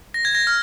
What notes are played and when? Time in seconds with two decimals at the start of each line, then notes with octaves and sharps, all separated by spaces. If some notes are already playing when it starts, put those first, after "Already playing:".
0.14 A#6
0.25 G#6
0.35 A#6
0.47 F6